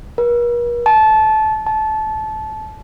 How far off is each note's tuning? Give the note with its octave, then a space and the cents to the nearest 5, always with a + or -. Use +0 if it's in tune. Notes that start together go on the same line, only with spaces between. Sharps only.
A#4 +45
A5 -20
A5 -20